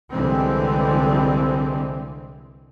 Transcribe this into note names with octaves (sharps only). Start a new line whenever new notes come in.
C2 D3 E3 G3 G#3 C4